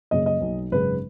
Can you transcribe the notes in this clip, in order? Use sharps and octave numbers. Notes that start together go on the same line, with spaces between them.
F#1 F#2 C#3 D#5
D#5
B1 B2
G#1 F#2 C#3 B4